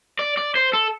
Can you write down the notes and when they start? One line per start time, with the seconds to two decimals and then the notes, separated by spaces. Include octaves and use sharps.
0.19 D5
0.37 D5
0.55 C5
0.73 A4